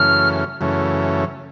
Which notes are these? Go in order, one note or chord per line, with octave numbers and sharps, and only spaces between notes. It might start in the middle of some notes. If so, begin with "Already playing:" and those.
Already playing: F#2 C#3 E3 A3 C#4 F6
F#2 C#3 E3 A3 C#4